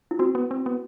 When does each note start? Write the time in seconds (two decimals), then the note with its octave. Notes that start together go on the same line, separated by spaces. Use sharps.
0.11 E4
0.19 C4 F#4
0.35 B3
0.51 C4
0.66 B3